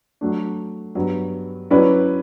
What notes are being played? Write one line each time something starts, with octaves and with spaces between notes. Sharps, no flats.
F#3 A3 D4
G2 F#3 B3
F#3 C#4 E4 B4 D5